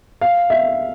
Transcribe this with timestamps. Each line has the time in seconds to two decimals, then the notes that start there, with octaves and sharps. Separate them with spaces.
0.21 F5
0.50 E5